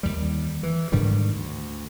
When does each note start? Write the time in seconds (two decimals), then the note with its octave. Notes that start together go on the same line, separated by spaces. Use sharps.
0.03 D#2 G3
0.63 E3
0.92 G#2 D3 D#3 G3
1.33 D2